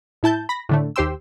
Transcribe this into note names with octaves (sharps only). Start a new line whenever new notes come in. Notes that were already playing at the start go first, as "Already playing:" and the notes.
A2 E4 A5 G6
B5 A#6
A2 D3 A3
D#2 G4 C5 G5 C6 E6